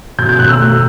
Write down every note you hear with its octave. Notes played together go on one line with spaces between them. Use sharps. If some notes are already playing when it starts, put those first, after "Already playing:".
B2 G6
G6
B2 F#6
E6
A3